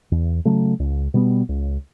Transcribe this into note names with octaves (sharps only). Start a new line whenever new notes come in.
E2
C#3 F#3 A3
C#2
B2 G3 B3
C#2